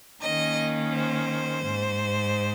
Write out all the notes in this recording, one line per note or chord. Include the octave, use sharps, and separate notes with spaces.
D#3 A#3 C#4 D#5
C5
G#2